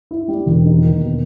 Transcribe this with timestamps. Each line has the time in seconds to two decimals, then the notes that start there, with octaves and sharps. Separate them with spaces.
0.11 E4
0.28 G3
0.46 E1
0.64 D#3
0.82 D#2
1.00 B2